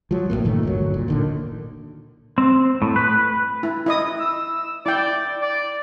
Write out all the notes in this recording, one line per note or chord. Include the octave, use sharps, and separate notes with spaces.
F3 F#3
A#1 E2 A2 A#3
G1 A#2 D#3 A3
G1 D2 F#3
A#2
A#2 D3 D#3
C4
A2
B4
E4
E4 D#5 D#6
E6
E4 D5 G5
D5